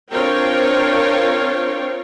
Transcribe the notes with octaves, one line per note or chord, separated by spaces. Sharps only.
C4 D4 F4 A#4 C#5 G5